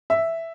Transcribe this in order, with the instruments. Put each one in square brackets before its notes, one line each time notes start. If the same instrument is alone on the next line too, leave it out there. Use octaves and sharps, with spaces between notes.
[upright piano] E5